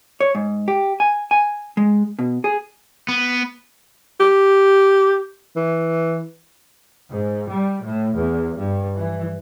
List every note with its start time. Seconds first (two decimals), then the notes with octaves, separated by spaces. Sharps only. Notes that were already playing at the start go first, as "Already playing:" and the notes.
0.20 C#5
0.35 G#2
0.68 G4
1.00 G#5
1.31 G#5
1.77 G#3
2.19 B2
2.44 G#4
3.08 B3
4.20 G4
5.56 E3
7.10 G#2
7.50 G3
7.82 A2
8.15 E2
8.55 G2
8.97 E3